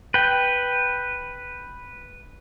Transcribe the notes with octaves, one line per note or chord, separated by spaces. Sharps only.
B4 G5